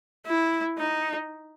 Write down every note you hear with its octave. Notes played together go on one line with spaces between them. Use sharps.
E4
D#4